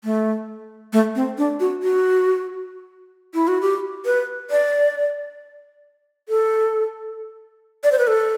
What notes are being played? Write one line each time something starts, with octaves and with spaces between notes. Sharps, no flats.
A3
A3
C4
D4
F#4
F#4
E4
F#4
G4
B4
D5
A4
D5
C5
B4
A4